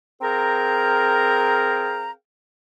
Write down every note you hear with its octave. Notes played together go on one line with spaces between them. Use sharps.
C4 G#4 A#4 F5 G5 A#5